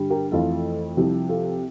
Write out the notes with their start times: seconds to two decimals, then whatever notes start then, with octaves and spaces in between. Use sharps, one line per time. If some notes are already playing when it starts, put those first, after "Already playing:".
Already playing: G2 D3 G3
0.10 G4 A#4
0.32 F2 E3 A3 F4 A4
0.97 C2 C3 F3
1.29 F4 A4